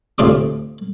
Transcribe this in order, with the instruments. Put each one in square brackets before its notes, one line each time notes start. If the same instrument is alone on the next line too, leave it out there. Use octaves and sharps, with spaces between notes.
[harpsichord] D2 A2 C3 F4 D6 D#6